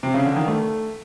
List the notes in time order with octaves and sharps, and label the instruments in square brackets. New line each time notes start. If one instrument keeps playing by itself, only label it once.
[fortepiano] C3
C#3
D3
D#3
A3